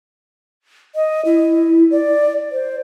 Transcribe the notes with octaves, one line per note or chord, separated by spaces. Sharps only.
D#5
E4
D5
C5